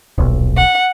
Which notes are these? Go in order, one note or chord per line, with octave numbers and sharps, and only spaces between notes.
D#1 B1
F#5